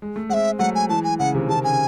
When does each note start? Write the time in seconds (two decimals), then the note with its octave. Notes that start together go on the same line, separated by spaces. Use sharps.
0.02 G#3
0.16 A3
0.29 G#3 C4 F#5
0.34 E5
0.59 F#3 A3 F#5
0.75 G#5
0.89 E3 G#3 A5
1.04 G#5
1.19 C#3 F#5
1.35 C3 D#3
1.49 C3 D#3 A5
1.64 C#3 G#5